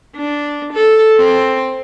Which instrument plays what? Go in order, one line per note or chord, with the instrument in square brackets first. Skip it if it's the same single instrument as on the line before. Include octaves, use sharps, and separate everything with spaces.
[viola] D4
A4
C4